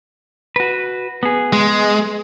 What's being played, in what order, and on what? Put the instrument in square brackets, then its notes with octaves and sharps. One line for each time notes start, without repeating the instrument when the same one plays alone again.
[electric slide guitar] F#4 B4
B3 G#4
[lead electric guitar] G#3